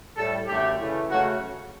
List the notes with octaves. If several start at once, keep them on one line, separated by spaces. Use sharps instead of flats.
A2 G3 A4
F#2 D3 A3 G4
C#3 E3 A3
C#3 F#3 A3 F#4